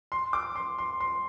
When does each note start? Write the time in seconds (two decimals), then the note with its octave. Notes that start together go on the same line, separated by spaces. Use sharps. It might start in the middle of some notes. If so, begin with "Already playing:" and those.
0.12 C6
0.33 D6
0.55 C6
0.78 C6
1.00 C6